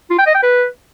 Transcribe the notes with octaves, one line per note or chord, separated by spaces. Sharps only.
F4
G5
D#5
G5
B4